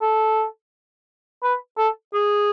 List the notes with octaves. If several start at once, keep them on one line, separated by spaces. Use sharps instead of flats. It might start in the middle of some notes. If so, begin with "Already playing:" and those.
A4
B4
A4
G#4